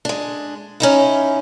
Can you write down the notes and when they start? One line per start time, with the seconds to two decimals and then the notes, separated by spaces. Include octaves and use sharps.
0.05 G#3 D4
0.80 C#4 D#4 E4